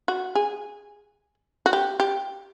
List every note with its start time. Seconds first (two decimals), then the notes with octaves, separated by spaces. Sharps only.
0.08 F#4
0.35 G#4
1.66 F#4
1.73 G4
2.00 G4